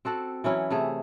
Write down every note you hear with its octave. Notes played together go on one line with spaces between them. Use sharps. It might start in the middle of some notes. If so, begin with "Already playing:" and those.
C4 F#4 A4 F#5
E3 F#3 C#4 E4
C3 A3 G#4